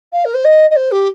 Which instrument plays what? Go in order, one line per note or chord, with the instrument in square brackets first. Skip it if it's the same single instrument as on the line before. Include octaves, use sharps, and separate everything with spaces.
[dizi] F5
A#4
C5
D#5
D#5
C5
G4